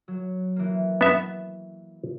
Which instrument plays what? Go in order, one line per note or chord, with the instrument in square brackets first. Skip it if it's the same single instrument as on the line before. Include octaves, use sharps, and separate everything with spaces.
[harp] F#3
E3 A#3
[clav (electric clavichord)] B3 E5